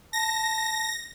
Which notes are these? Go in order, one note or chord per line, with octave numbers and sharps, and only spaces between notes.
A5 A#6